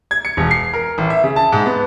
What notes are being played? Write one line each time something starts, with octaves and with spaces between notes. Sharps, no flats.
G#6
C#7
E1
C7
A#4
A1
E5
C#3
A5
G#2
B3